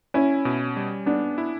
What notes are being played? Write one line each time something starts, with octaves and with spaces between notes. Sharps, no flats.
C#4 E4
B2
G3
B3 D4
E4